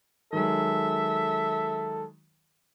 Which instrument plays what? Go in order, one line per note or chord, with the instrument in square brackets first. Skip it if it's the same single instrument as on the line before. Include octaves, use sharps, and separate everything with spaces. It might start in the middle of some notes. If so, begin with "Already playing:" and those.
[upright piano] D#3 F#3 G#3 [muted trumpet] A4 [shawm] E5